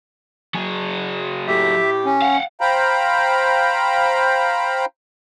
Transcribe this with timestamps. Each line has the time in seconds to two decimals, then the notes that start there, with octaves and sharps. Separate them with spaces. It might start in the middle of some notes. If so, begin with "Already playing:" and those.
0.54 F#3 G#4
1.48 A2 A3 G4 E5
2.06 C#4
2.22 F5 F#5
2.61 C5 F5 G5 A#5 B5